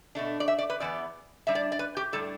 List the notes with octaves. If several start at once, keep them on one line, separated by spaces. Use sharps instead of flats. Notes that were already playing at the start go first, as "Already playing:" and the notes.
B2 A3 D4
D5
E5
D5
B4
E2 E3 B3 D5
A2 G3 D4 E5
D5
D5
B4
G4
A2 G3 D4 A4